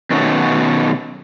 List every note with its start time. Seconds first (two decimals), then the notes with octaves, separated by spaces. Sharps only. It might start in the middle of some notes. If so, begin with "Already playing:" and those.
0.11 B2 D#3 F#3 A3 B3 C#4